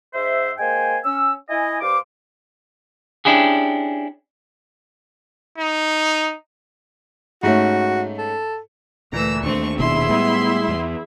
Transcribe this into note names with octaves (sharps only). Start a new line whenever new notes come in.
G#2 C5 E5
G#3 A#3 C5 G5 G#5
C#4 E6
E4 D#5 G#5
G2 C5 F5 D6
C#4 D4 E4 G4 G#4
D#4
G#2 A3 C#4 F#4
A4
D2 A#2 E3 A3 A#5 E6
D#2 A3 C4 D4 C#6
D#1 B2 E4 G#4 E5 C6
A2 G3 G#3 B3
E2